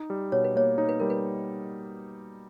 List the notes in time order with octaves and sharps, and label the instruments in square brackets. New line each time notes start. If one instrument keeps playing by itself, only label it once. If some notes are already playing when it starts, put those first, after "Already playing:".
Already playing: [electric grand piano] D#4
G3
[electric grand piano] B2 [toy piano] C#5
[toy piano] B4
[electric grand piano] A#3 [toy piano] C#5
[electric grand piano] D#4 [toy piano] C#5
[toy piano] B4
[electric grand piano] G3 [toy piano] A#4
[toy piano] B4